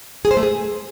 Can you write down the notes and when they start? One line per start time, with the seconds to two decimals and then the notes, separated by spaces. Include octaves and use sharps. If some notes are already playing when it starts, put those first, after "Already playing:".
0.25 G#4
0.31 C5
0.37 A3
0.43 G#4